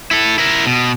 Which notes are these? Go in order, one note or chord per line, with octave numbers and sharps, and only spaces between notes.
E4 A4
E4 A#4
B2